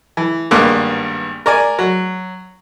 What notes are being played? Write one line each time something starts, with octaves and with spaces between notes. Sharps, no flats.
E3
G#1 G2 A#3 B3 D6 F#6
A#4 D5 G#5
F#3